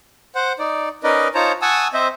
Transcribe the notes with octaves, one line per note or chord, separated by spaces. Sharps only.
C5 F#5
D#4 D5
C#4 D#4 A#4 B4 D5 D#5
D#4 F4 C5 C#5 A5 A#5
F#5 G#5 A5 C#6 D#6 E6
C4 C5 D#5 E5